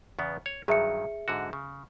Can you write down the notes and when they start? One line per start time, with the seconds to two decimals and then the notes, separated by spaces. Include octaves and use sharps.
0.19 E2 C#3 B3
0.46 C#5
0.68 G2 D#3 F#3 G#4 E5 C#7
1.28 G#2 D3 F#4
1.53 C#3